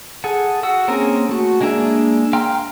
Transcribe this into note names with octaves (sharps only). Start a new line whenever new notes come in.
G#4 A4 F#5
F#4 F#5 E6
A#3 C4 C#4 G#4 A#4
A3 F#4
G#3 A#3 D4 G#4 E5
F5 G5 A#5 C6 F6